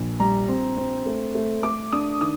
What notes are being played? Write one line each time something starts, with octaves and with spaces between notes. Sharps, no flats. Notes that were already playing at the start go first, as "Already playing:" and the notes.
Already playing: A#1
G3 A#5
C4
C4
A3
A3
A3 D6
D4 D#6
D#3 D#6